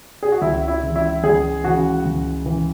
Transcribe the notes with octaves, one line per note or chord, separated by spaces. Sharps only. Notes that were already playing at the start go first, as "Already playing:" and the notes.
G#4
F#4
C#2 E4
E4
C#3 E3
E4
C#2 G#4
C#3 E3 F#4
C#2
C#3 E3